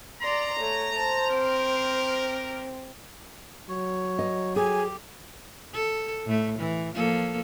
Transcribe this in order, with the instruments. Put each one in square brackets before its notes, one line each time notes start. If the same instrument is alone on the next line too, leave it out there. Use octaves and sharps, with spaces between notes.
[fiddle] D5 C6 [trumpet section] A#5
[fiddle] A3 [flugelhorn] C#5
[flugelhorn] C5 [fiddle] A5
[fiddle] C4 [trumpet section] G4 A#4
[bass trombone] F#3 [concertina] C#5
[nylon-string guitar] D#5
[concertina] G4 [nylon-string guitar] G#4 [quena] G#5
[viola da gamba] A4
A2 A3
E3
F3 A#3 A4